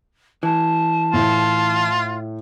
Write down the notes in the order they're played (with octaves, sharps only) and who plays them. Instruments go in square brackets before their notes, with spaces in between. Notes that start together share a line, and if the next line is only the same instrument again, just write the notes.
[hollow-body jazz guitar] E3 [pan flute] A5
[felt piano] A2 [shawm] F4